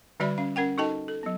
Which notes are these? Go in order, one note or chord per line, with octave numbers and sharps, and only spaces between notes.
D3 G3 F#4 D5 E5 B5
C#4 F5
C#4 A#4 F#5 G5
D#4 F#4 A4 D#5 G5 A5
A4
F#3 B3